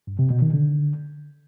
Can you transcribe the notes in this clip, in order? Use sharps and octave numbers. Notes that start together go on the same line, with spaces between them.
G2
C3
B2
D#3
D3